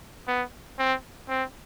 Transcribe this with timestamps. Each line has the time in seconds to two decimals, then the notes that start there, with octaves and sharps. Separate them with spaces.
0.28 B3
0.78 C4
1.29 C4